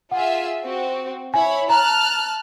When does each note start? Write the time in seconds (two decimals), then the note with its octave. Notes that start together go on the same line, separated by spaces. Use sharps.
0.11 F4 G#4 E5 F#5
0.65 C4 F#4
1.34 E4 C#5 G#5 B5
1.69 A5 A#5 F6 F#6